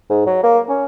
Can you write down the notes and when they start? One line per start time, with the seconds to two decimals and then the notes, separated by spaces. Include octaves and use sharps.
0.10 G#2
0.26 F#3
0.43 A#3
0.69 C#4